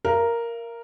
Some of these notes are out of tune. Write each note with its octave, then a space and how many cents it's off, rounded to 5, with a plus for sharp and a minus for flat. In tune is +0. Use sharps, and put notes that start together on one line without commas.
A#4 +0 F5 -45